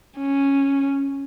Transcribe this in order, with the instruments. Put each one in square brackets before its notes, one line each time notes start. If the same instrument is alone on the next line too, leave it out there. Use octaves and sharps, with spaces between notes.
[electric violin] C#4